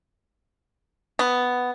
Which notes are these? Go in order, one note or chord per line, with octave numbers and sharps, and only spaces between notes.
B3